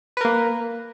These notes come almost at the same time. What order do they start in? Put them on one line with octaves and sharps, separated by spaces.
B4 A#4 A#3